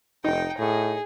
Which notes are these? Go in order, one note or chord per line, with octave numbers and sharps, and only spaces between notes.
F1 D#4 G5
A2 G#4